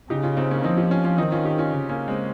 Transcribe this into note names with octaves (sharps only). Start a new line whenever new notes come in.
C#3 D#4 G4
C#4 F4
C4 D#4
A#3 C#4
F3 C4 D#4
D#4 G4
C#4 F4
C#4 F4
D#3 C4 D#4
C#4 F4
D#4 G4
C#4 F4
C#3
A#3 C#4
G#3 C4